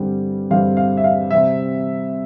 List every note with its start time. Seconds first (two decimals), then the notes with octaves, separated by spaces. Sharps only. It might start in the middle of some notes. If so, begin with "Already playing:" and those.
Already playing: G2 D3 G3 C4
0.50 G2 D3 G3 C4 F5
0.77 F5
0.97 E5
1.04 F5
1.31 C3 G3 C4 E5